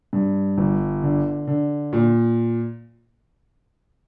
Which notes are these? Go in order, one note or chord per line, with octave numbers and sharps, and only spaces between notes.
G2
G1
D3
D3
A#2